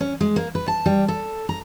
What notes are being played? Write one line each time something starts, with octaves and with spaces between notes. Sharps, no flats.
C#4
G#3
A#3
B4
A5
G3
A4
A#5